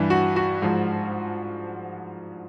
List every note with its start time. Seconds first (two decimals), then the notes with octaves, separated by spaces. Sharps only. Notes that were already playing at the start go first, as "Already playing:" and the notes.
Already playing: G2 E3
0.10 F#4
0.36 F#4
0.62 G#2 F3